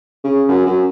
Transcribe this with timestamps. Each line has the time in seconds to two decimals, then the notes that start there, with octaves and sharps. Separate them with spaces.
0.24 C#3
0.48 F#2
0.66 F#2